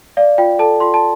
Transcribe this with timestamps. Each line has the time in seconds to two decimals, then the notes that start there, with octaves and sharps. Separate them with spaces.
0.17 D5 F5
0.38 F4 G5
0.59 A4 A5
0.80 F4 C6
0.94 A5